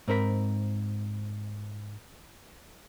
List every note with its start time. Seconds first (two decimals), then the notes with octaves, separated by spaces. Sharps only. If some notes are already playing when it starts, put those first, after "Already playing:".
0.08 G#2 C4 A#4 C5 B5